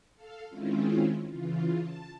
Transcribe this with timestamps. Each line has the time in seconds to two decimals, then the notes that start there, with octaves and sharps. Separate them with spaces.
0.15 A4 F5
0.49 D#3 G#3 C4 C#4 E4 F4
1.31 C#3 E3 F4
1.77 A5